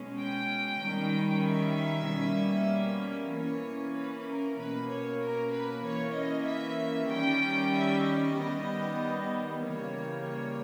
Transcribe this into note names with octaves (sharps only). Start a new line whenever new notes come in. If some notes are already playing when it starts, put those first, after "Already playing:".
Already playing: B2 G#3 C#4
G5
D#3 G3 C#4
E5
B2 G3 A#3 C#4
E3 A#3 C#4 C#5
B4
A#4
B2 A#3 C#4 B4
C#5
A#4
B4
E3 A#3 C#4 C#5
D#5
E5
D#3 G3 C#4 G5
E5
D#5
D#3 G3 B3
C#3 E3 G3 A#3 C#4 C#5
C#5